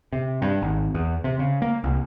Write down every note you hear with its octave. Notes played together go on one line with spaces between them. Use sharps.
C3
G2
G#1
E2
C3
C#3
A#3
C2